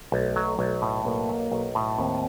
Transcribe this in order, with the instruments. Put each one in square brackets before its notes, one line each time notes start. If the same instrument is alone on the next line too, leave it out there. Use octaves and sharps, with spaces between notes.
[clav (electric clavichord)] B1 [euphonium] A3
[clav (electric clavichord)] F#3
B1
A2
[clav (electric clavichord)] B1 [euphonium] A#3
[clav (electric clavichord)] F#3
B1
A2
[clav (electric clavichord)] D#2 [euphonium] C4